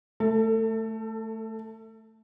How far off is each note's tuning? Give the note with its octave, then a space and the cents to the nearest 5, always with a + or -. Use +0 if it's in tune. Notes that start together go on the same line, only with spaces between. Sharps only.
A3 +0 A4 +30